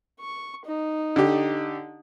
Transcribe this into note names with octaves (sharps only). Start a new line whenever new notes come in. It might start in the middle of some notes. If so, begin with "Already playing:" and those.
C#6
D#4
D3 G4